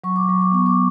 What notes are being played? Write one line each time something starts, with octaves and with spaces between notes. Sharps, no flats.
F#3 C#6
D6
F#3 C#6
D6
B3 C#6
D6